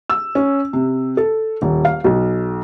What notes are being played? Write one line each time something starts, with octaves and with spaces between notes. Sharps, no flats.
E6
C#4
C3
A4
D#1
F5
B1